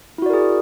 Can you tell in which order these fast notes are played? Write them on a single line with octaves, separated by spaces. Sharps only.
E4 F#4 D5 A#4 G#4